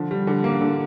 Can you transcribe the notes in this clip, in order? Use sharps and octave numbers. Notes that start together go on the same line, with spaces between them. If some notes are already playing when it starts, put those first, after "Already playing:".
Already playing: D3 F3
G3
D3
A#3
D3